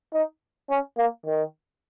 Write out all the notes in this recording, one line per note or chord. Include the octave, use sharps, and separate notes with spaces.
D#4
C#4
A#3
D#3